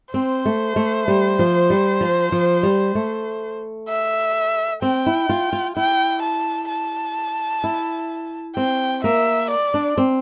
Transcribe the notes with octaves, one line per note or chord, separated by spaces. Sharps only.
C4 C5
A3
A3
G3
F3
G3
F3
F3
G3
A3
E5
C4 G5
E4
F4
F4
E4 G5
A5
A5
E4
C4 G5
A#3 E5
D5
D4
C4